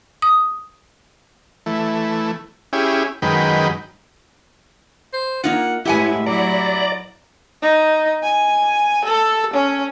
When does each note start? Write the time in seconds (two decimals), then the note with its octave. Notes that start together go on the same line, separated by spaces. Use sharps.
0.22 D#6
1.66 E3 A3
2.73 C#4 E4 G4 G#4
3.22 F#2 D#3 G#3 B4 G5
5.13 C5
5.44 A#3 D#4 F4 F#5
5.85 A2 G#3 E4 G4 B4 E5 F#5 G#5
6.26 F#3 E4 D5 A#5
7.62 D#4
8.23 G#5
9.05 A4
9.54 C#4